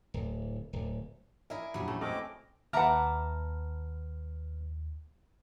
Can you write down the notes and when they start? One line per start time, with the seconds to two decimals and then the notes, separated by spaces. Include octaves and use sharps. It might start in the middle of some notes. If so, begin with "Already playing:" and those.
0.14 D1
0.73 D1
1.50 E4 G#4 A#4 D5 E5
1.74 A#1 E2 F#3 G3 G#4
1.88 A3 C#4
2.01 A3 C4 E4 D#5 D6 F6
2.73 D#2 B4 E5 F#5 A5 A#5 D6 F6